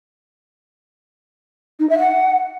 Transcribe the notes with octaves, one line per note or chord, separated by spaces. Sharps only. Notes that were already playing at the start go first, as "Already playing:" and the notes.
D#4
E5
F#5